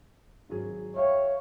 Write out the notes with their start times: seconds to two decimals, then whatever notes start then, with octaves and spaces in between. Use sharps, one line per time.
0.49 G#1 F#3 G#4
0.96 C#5 E5 F5 G5